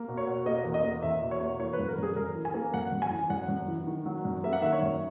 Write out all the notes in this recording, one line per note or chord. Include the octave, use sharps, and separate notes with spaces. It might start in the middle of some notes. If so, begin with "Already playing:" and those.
Already playing: A#3
B2
C#5
B2
A#3 D#5
E2
D#5
A#3
E2 E5
B2
C#5
A#3
E3 C#5
B4
F#2
A#4
F#2 G#4
F#2 A#4
E3
G#5
A#3
F#2 F#5
F#2
G#5
E3
F#2 F#5
F#2
E3
D#3
F#3
F#2
A#3 E5
F#5
D#3 E5
C#5
F#2